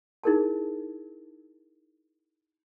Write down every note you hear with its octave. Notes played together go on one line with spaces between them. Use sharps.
D#4 E4 G#4 A#4 G#5 A5